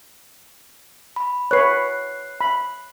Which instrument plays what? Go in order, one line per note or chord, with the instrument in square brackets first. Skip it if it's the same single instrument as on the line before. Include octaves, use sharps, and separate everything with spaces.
[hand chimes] B5
[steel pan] B4 C#5 [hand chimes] F#6 C7
[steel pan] B5